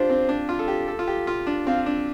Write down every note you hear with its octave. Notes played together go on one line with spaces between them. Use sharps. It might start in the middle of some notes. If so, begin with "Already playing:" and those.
Already playing: D4 F4 G4 C5
C4
D4
F4
A4
G4
A4
F4
G4
F4
D4
C4 F5
D4